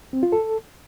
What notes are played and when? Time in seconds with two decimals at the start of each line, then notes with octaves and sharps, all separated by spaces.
0.13 C4
0.23 F4
0.32 A4